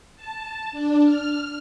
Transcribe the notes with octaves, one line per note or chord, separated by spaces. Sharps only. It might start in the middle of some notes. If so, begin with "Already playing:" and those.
A5
D4
F6